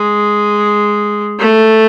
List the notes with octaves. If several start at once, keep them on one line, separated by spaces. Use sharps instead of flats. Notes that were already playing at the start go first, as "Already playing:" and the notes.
Already playing: G#3
A3